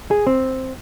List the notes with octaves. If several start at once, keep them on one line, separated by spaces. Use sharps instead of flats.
G#4
C4